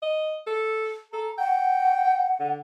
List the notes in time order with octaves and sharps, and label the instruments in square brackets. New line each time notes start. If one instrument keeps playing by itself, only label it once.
[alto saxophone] D#5
A4
[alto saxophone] A4 [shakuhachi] A#5
[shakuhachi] F#5 [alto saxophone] G5
[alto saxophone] D3